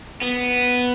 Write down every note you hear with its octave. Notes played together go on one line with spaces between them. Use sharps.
B3